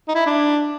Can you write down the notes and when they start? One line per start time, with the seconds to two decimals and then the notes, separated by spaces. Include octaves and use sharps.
0.08 D#4
0.15 E4
0.26 D4